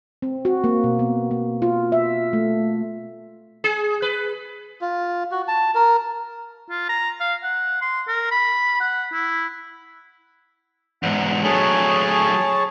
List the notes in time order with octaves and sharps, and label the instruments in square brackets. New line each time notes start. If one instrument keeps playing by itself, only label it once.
[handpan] C4
F#4
A#3
B2
B3
A#3
F4
E5
A3
[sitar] G#4
B4
[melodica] F4
F#4
A5
A#4
[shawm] F4
A#5
F5
F#5
C6
A#4
B5
F#5
E4
[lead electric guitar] E2 G#2 [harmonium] F#5
[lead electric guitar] F#3 A3 [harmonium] G#4 C#5 A5